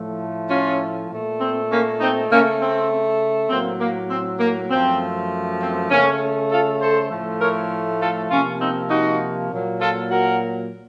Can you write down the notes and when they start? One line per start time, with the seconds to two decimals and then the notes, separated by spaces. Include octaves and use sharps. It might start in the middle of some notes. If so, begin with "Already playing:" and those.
Already playing: A2 F3 A3
0.50 C#4 F4
1.11 A#2 A3
1.41 C4
1.70 A#3 C#4
2.00 C4 D#4
2.30 C#3 A3 A#3 C#4
2.61 C4
3.50 A2 F#3 A#3 C4
3.80 A#3
4.10 C4
4.40 A#3
4.70 F#2 F3 A3 C4
5.60 C4
5.90 C#3 A3 A#3 C#4
6.51 F4 A4
6.81 A4 C5
7.10 A2 F3 A3
7.41 A#4 C#5
8.00 F4 A4
8.30 C3 F3 A#3 C#4 F4
8.60 C4 D#4
8.90 D#4 F#4
9.50 A#2 F#3 A#3
9.81 F4 A4
10.10 F#4 A#4